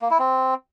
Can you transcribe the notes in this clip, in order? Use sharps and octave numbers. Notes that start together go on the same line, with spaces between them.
A#3
E4
C4